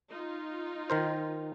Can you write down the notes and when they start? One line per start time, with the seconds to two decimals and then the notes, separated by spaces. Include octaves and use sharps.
0.11 D#4 F4
0.90 D#3 A#4 C5